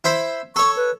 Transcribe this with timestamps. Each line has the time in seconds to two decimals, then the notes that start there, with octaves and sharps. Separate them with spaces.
0.04 E4 C5 B5
0.56 A4 C#5 C#6
0.77 B4